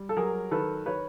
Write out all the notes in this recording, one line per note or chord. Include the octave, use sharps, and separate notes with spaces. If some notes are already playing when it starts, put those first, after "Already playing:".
Already playing: G3
A4
F#3 G#4 A#4
D#3 A4 B4
B4 C#5